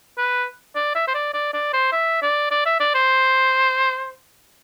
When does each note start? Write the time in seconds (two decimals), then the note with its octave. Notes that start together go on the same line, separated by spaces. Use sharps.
0.18 B4
0.76 D5
0.95 E5
1.08 C5
1.14 D5
1.34 D5
1.54 D5
1.73 C5
1.92 E5
2.22 D5
2.51 D5
2.66 E5
2.80 D5
2.95 C5